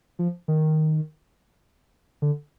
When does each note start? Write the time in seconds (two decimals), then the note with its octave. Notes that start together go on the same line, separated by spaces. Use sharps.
0.19 F3
0.48 D#3
2.22 D3